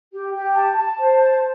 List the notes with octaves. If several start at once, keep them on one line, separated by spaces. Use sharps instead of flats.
G4
G4
A5
A5
C5
A5